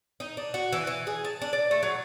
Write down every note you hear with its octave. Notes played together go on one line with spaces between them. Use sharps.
D#4
D4
F#4
E3
E3
G#4
A5
D4
D5
A3
F#3